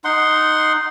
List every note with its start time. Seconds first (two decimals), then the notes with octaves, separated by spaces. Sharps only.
0.04 D#4 F#5 C6